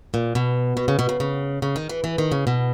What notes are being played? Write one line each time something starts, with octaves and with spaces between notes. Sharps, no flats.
A#2
B2
B2
C#3
B2
C#3
C#3
C#3
D#3
E3
E3
D#3
C#3
B2